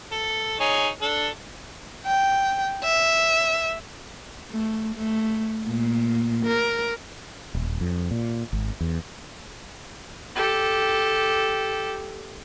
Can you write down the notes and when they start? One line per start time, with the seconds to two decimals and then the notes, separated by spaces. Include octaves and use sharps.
0.12 A4
0.60 D#4 G#4 C#5
1.02 D4 A4
2.05 G5
2.83 E5
4.51 A3
4.95 A3
5.67 A#2
6.46 A#4
7.55 D#1
7.81 F2
8.11 A#2
8.53 G#1
8.81 E2
10.35 G4 A4